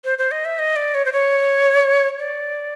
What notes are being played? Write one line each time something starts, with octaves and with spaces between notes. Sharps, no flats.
C5
C5
D#5
E5
D#5
D5
C#5
C5
C#5
D5